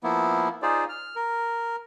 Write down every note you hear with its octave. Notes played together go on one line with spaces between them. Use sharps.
F3 A#3 B3 E4
D#4 F4 G#4 C5 D5
F6
A#4